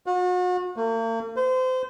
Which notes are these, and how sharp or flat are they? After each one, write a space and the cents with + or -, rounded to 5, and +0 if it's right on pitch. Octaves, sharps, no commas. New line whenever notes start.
F#4 -40
A#3 -45
C5 -30